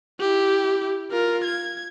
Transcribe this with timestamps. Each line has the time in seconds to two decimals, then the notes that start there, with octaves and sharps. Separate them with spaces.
0.20 E4 G4
1.11 F4 A#4
1.44 G#6